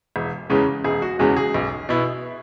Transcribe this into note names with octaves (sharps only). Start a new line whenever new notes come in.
E1
E2 C#3 G#3 C#4
E1 G#4
F#4
E2 C#3 G#3 C#4 F#4
G#4
B1
B2 B3 E4